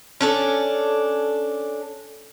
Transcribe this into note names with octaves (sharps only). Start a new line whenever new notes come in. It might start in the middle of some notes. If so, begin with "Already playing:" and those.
C#4 D4 A4